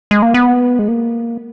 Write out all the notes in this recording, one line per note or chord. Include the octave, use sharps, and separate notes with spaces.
G#3
A#3
B3
G#3
A#3